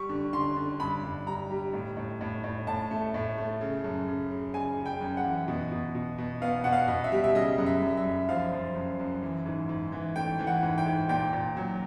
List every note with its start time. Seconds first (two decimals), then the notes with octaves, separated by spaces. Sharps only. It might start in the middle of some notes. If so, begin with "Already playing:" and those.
Already playing: G3 C#6
0.09 D3
0.33 D3 C6
0.56 D3
0.80 G2 B5
1.04 G2
1.27 G3 A#5
1.51 G3
1.73 A2
1.97 A2
2.21 A2
2.44 A2
2.67 A2 A5
2.91 A3
3.14 A2
3.38 A3
3.61 C#3
3.84 F#2
4.08 C#3
4.31 C#3
4.54 C#3 G#5
4.77 C#3
4.86 G5
5.01 F#2
5.17 F#5
5.24 E3
5.48 B2
5.72 B2
5.95 B2
6.18 B2
6.42 B3 F5
6.64 B2 F#5
6.72 F5
6.88 B2
7.04 E5
7.12 G3
7.24 E5
7.35 C#3 D#5
7.58 F#2
7.66 E5
7.82 F#2
7.97 E5
8.05 F#2
8.29 F3 F5
8.53 F3
8.76 F#2
8.99 F#2
9.22 E3
9.46 G#2
9.69 G#2
9.92 E3
10.16 A3 G5
10.39 E3
10.47 F#5
10.63 G#2
10.78 G5
10.86 G#2
11.09 A#2 G5
11.33 A#2
11.57 F#3